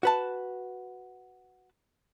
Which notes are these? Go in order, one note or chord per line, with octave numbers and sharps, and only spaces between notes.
F#4 B4 A5